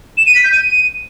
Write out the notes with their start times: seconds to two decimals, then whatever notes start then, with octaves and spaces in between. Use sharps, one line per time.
0.17 E7
0.26 D#7
0.35 B6
0.44 G6
0.53 D#7